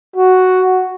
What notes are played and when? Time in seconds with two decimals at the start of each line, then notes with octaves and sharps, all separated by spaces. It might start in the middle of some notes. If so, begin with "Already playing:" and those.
0.16 F#4